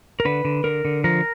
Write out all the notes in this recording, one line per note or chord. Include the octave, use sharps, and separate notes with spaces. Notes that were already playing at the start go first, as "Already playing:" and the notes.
A#4
D3 B4
D3
D3 A#4
D3
F3 A#4